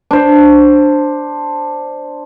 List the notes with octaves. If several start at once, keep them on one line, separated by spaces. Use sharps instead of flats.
D4 C5